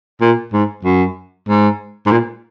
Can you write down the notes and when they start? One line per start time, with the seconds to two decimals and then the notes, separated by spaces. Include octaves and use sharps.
0.21 A#2
0.53 G#2
0.84 F#2
1.49 G#2
2.06 G#2
2.12 A#2